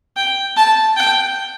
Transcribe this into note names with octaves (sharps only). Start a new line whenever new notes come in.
G5
A5
G5